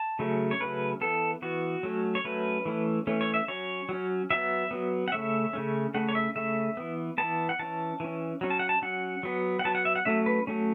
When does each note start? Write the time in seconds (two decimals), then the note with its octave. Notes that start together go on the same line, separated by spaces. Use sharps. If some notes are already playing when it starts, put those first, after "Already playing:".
Already playing: A5
0.19 C#3 F#3 A3 C#4
0.51 C#5
0.60 C#3 F#3 A3 C#4 B4
1.01 E3 B3 A4
1.42 E3 B3 F#4
1.83 F#3 A3 C#4
2.15 C#5
2.24 F#3 A3 C#4 B4
2.66 E3 A3 C#4
3.07 E3 A3 C#4
3.21 C#5
3.34 E5
3.48 F#3 C#4 C#5
3.89 F#3 C#4
4.30 F#3 B3 E5
4.71 F#3 B3
5.08 F#5
5.12 C#3 A3 C#4 E5
5.53 C#3 A3 C#4
5.94 C#3 A3 C#4 F#5
6.09 C#5
6.15 E5
6.35 C#3 A3 C#4 E5
6.77 E3 B3
7.18 E3 B3 A5
7.49 F#5
7.59 E3 C#4 A5
8.00 E3 C#4
8.41 F#3 C#4
8.50 A5
8.59 F#5
8.69 A5
8.82 F#3 C#4 F#5
9.23 F#3 B3
9.59 F#5
9.64 F#3 B3 A5
9.75 F#5
9.85 E5
9.95 F#5
10.05 F#3 A3 C#4 E5
10.26 B4
10.47 F#3 A3 C#4